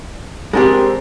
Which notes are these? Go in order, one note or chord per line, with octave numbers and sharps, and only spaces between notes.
G#3 C4 D4 G4 A#4